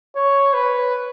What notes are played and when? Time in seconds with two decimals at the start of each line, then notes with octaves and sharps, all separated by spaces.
0.16 C#5
0.54 B4